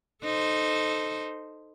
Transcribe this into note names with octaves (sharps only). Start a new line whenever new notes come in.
D#4 A4 C5